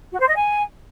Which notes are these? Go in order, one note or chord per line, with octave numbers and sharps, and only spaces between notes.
F#4
C5
D#5
G#5